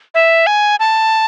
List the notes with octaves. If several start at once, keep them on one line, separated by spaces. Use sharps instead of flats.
E5
G#5
A5